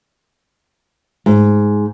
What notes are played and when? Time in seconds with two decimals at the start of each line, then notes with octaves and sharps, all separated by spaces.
1.26 G#2